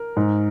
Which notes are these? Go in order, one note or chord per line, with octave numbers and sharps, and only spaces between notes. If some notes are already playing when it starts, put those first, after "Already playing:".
Already playing: A#4
G#2